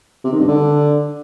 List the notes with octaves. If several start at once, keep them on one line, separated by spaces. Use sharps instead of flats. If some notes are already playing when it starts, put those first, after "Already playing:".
C3
D#3
G2
D3